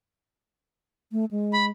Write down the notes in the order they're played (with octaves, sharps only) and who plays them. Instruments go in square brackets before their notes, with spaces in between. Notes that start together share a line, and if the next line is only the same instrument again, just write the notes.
[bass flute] A3
G#3
[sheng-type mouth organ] B5